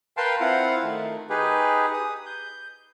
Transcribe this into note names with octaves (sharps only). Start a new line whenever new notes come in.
A#4 B4 F5 G5 A5 C6
C4 E4 F4 F5 F#5
D#3 A3
D#4 G4 G#4 B4
D#6
G6